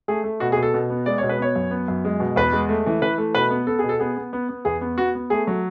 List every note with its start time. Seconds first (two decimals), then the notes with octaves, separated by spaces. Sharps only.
0.08 A3 G#4
0.24 A3
0.40 B2 F#4
0.52 G#4
0.57 B2
0.62 A4
0.74 B2
0.90 B3
1.06 G#3 D5
1.18 B2 C#5
1.29 B4
1.39 B3 C#5
1.56 F#2
1.71 B3
1.88 F#2
2.05 G#3
2.20 B2
2.36 E2 B4
2.53 G#3
2.69 A3
2.86 E3
3.02 E3 B4
3.18 A3
3.34 B2 B4
3.50 B3
3.67 B3 A4
3.79 B2 G#4
3.89 A4
4.00 B3 G#4
4.17 B3
4.33 B3
4.49 B3
4.65 E2 G#4
4.81 B3
4.98 B3 F#4
5.15 B3
5.30 A3 G#4
5.47 F#3